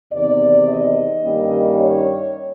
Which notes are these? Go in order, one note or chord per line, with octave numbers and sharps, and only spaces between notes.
E2 C3 D#3 D5
D#5
G2 D#3 G3 A#3 C#4
C#5